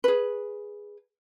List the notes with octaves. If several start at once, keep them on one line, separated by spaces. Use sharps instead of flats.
G#4 B4